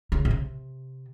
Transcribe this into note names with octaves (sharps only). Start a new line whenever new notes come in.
C#3
B2
C3